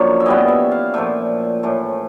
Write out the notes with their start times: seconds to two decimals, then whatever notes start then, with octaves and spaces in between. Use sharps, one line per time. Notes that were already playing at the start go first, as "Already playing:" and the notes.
Already playing: F#2 D3 F3 A#3 C#5
0.20 E5
0.25 E3 G3 B3 D#5
0.48 E5
0.71 F5
0.94 A#2 F3 A3 E5
1.63 A2 E3 A3